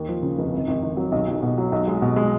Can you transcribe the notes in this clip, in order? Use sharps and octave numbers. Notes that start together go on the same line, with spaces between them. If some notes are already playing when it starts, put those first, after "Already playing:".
Already playing: D#2
F3
C#3
F1
G#1
G#1
G#1
F#3
B1
B1
B2
F#3
B1
G#3
B2
G#3